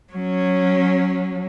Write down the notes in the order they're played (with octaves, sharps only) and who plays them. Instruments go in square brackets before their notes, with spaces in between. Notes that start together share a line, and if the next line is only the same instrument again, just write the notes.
[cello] F#3 C#4